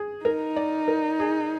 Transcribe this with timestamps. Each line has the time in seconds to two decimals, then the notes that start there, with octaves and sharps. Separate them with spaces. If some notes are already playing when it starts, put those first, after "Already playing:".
Already playing: G#4
0.25 D#4 A#4
0.56 D5
0.88 A#4
1.20 G#4